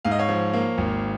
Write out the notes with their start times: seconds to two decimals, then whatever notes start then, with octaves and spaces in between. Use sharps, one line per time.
0.05 G#2 F5
0.11 D#5
0.19 C#5 F5
0.29 F3
0.53 A#3
0.78 G#1